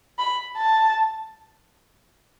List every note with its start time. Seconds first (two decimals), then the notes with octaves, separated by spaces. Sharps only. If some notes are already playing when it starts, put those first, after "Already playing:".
0.19 B5
0.57 A5